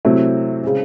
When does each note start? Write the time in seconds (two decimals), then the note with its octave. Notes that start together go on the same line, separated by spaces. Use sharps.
0.05 C3 F#3 A3 C4 E4
0.63 C#3 G#3 C4